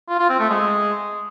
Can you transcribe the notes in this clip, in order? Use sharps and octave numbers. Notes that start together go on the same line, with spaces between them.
F4
F4
C4
A3
G#3